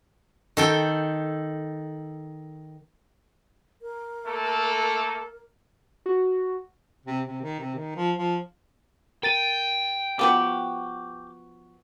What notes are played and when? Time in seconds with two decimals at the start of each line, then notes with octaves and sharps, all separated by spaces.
0.57 D#3 A4 G5
3.82 A#4
4.26 A3 A#3 A4
6.06 F#4
7.06 C3
7.26 C3
7.42 D#3
7.59 C3
7.75 D#3
7.96 F3
8.16 F3
9.23 A#4 G5 A6 D#7
10.19 F3 B3 F#4 G4